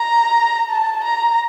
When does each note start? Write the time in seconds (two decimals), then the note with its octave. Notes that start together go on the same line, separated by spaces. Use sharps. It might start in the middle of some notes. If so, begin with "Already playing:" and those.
Already playing: A#5
0.70 A5
1.04 A#5